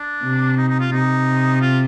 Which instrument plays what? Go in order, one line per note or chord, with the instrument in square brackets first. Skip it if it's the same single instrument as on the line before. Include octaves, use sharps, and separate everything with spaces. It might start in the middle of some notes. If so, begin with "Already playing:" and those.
Already playing: [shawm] D4
[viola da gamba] C3
[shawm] D#4
D#4
F4
[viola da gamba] C3 [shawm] D#4
[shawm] F4